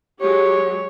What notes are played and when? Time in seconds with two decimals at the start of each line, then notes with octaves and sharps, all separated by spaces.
0.21 F#3 G#3 G4 C#5